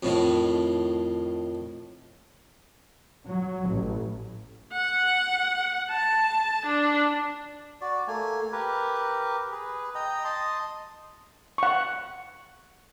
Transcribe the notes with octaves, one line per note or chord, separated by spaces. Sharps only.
F2 A2 D#3
F#3
A1
F#5
A5
D4
F#4 D5
A3 A#3 G#5
G4 A#4 B4
G#4 B4
D#5 G5 A#5
D#5 A5 C6 D#6
F#5 C#6